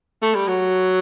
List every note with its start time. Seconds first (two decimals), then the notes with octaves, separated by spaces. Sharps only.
0.22 A3
0.35 G3
0.48 F#3